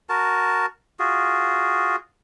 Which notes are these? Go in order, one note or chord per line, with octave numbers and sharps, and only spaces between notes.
F#4 A#4 A5
F4 F#4 G#4